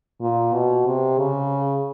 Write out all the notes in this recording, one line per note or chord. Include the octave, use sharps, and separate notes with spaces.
A#2
B2
C3
C#3